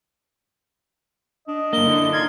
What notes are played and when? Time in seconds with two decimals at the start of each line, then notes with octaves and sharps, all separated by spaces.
1.48 D4 D#5
1.73 F#2 A#3 G7
1.86 D3 D4 E4
2.13 D#4 F4 G#6